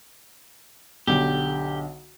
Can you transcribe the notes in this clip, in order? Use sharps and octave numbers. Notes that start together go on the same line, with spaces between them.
B1 D3 G4